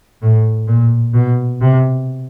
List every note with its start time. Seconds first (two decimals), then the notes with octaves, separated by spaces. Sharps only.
0.22 A2
0.68 A#2
1.14 B2
1.61 C3